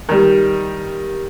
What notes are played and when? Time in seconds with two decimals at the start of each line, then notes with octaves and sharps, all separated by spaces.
0.09 D#3 G3